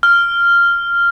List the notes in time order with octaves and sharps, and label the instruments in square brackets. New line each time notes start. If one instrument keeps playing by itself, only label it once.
[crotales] F6